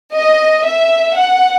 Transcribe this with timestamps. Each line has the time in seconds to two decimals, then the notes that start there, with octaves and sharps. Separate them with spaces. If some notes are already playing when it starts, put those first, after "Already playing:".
0.14 D#5
0.65 E5
1.16 F#5